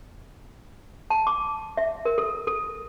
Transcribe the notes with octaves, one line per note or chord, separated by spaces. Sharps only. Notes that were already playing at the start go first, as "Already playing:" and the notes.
A5
D6
E5
A#4
A4
A4